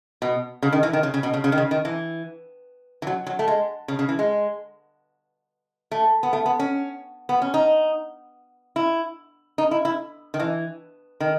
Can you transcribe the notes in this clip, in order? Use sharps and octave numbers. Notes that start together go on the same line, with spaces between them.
B2
C#3
D#3
E3
D#3
C#3
C#3
B2
C#3
C#3
D#3
C#3
D#3
E3
E3
F#3
F#3
A3
G#3
C#3
C#3
E3
G#3
A3
B3
A3
B3
C#4
B3
C#4
D#4
E4
D#4
E4
E4
D#3
E3
D#3